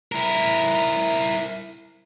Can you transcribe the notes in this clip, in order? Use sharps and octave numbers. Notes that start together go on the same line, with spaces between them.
E4 A#4